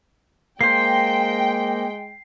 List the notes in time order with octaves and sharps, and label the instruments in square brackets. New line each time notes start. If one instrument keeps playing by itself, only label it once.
[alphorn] G#3 [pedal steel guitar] A#3 C5 [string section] G5 [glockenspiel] C7